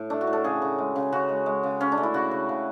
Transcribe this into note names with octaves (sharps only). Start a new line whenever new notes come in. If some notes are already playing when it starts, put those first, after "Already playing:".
Already playing: A2
A3 D4
F#4
A2
A4
C#3 G#4
C#3
G#3
C#3
C#3 F#4
G#3
G#3
C#3
C#3 C#4
D4
A3
E4
C#3 F#4
C#3
C#3